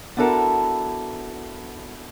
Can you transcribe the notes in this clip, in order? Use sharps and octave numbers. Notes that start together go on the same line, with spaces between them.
B3 D4 E4 F#4 A4 A#4